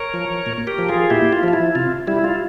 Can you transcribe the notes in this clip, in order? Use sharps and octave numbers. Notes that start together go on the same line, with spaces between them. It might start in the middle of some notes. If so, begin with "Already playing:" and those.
Already playing: A#4 C#5
F3
A#2
G4 A#4
F3
F4 G#4
A#2 E4 G4
F4
F3 F4
E4
C3 F4
G3 E4
F4